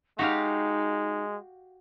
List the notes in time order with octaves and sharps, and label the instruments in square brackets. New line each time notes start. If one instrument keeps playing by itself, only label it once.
[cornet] G#3 [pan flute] D#4 [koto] F#4 G4 F5